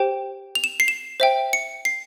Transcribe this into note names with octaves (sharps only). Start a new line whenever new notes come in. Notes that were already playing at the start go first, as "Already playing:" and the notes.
Already playing: G4 C5 G5
F7
E7
C7
E7
C5 E5 G5
C#7
C7